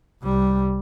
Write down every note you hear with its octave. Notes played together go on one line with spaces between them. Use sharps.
C2 G3